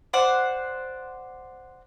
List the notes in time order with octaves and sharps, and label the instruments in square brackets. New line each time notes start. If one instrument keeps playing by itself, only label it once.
[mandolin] C5 D5 F#5